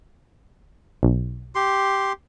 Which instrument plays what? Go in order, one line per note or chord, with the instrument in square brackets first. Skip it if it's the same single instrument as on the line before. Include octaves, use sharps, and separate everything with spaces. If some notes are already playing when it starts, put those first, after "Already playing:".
[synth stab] B1
[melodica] G4 C6